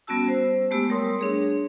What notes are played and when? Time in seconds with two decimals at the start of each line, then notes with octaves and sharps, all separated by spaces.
0.07 G3 B3 C#4 F#4 A5 E6
0.28 C5
0.71 G#3 A3 B3 G4 E6
0.90 G3 A3 A#4 C#5 C6 D#6
1.19 D4 G#4 C#5